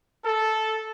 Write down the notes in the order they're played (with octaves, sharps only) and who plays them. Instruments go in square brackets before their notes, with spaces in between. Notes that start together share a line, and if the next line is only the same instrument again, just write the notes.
[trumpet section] A4